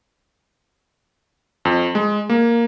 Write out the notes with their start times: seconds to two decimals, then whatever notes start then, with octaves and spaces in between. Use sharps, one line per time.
1.65 F2
1.95 G#3
2.29 A#3